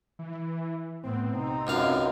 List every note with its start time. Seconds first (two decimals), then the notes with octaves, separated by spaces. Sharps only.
0.19 E3
1.04 A2 B3 C4
1.34 C3 D#4
1.67 C#2 F#2 F5